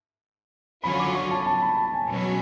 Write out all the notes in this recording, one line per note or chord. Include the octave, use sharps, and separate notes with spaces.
D3 F#3 C#4 F4 B5
D6
C#6
A5
A5
B5
A5
G#5
B2 F#3 C#4